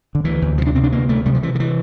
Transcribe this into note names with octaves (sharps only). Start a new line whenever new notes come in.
D3
D2 E3
D2
C3 F3
D4
C3 C4
D4
D2 A#3
D2 A3
C3 G3
F3
C3 E3
D3
E3